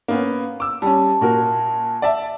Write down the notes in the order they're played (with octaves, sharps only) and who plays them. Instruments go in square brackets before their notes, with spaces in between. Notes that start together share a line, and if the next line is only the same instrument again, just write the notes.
[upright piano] A#3 B3 C#4
D6 E6
[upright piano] G3 C#4 [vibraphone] A5
[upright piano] A#2 F#4 A#4
D5 E5 A5